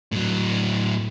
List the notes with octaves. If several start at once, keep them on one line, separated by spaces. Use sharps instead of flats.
A2 F#3